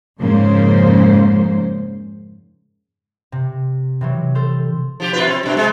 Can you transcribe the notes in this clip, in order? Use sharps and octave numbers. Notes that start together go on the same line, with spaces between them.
F2 G#2 C#3 A#3 C5
C3
C3 E3 F#3
A4 C5 F6
F3 G4
B2 F4 B4
C4
G2 B2
C3 G#3